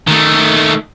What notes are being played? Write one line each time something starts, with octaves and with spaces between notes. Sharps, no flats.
D#3 A3